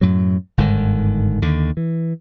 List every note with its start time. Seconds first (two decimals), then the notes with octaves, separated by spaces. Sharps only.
0.01 F#2 A2 F#3
0.58 G1 G#2 D3 D#3
1.42 D#2 D3
1.77 E3